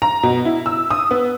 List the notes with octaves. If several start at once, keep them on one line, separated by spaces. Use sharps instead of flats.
A#5
B2
E4
E6
D#6
B3